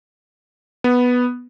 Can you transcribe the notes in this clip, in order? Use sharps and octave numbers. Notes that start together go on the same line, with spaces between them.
B3